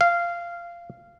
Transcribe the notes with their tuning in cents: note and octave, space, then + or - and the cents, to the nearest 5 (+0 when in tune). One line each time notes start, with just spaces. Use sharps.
F5 -15